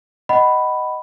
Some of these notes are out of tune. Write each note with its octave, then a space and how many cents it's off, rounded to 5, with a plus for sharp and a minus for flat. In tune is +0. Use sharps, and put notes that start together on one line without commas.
D#5 +0 F#5 +25 B5 +0